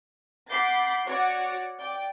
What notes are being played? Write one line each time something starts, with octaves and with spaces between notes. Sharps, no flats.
F#5 B5 D6 G6 A6 C7
F#4 C#5 D5 F#5
D5 G5